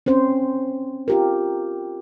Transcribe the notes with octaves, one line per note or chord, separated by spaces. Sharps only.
C4 C#4 C5
F4 G4 A#4